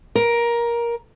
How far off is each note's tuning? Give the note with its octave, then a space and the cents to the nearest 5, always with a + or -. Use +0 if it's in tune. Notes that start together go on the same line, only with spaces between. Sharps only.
A#4 +15